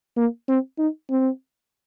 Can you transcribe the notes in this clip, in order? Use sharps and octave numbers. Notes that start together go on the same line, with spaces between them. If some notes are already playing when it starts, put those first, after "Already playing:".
A#3
C4
D#4
C4